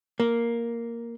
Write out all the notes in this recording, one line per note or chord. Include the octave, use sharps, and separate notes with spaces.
A#3